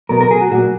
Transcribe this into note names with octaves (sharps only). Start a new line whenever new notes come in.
B2 F#3 B3 A#4
A#4
G#4
F#4
A#2 F#3 A#3 F#4